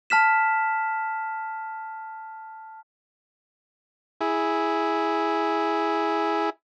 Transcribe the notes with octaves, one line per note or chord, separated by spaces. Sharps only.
A5 F6 B6 E7
E4 G#4